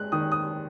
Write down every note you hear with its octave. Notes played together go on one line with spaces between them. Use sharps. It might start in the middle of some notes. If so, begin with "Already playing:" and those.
Already playing: G#3 F#6
D#3 D#6
D#6